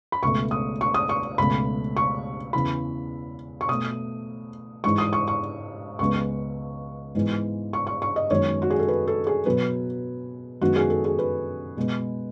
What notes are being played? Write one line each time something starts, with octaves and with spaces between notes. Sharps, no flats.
B5
C#2 B2 A3 C#6
D#6
C#6
D#6
C#6
C#2 B2 A3 B5
C#6
E2 C#3 E3 B5
C#6
B2 A3 D#6
G#2 E3 G#3 C#6
D#6
C#6
C#6
C#2 C#3 G#3 B3 C#6
G#2 E3 G#3 B3
C#6
C#6
C#6
D#5
F#2 D#3 G#3 B3 C#5
F#4
G#4
A4
B4
A4
G#4
B2 F#3 B3 B4
F#2 D#3 G#3 B3 F#4
G#4
A4
G#4
B4
B2 G#3 B3